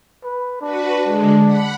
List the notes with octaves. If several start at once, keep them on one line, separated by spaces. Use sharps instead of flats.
B4
D4 F#4 B4
D3 G#3
F#5 B5